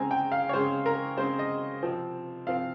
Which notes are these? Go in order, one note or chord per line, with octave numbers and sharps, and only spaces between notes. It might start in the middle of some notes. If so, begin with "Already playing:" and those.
Already playing: C#3 G#3 C4 G#5 A#5
G5
F5
C#5
C#3 G#3 C4 C5
A#4
C#3 G#3 C4 C5
D#5
C3 F3 C4
C3 F3 C4 F5